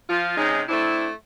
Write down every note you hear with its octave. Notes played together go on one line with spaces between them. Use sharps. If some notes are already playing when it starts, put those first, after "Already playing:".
F3 F4
C3 G#3 C#4 D#4
A3 C4 D4 E4